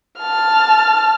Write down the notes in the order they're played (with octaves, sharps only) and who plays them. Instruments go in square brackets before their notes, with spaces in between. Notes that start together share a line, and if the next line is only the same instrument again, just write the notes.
[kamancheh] A5 F6